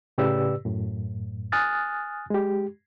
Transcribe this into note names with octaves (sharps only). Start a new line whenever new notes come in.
A2 C#3 G4 B4 D5 E6
F#2 A2
G#5 D#6 F6 F#6 A6
G#3 G4